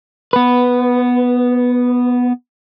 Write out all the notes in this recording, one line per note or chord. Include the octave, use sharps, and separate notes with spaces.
B3 B4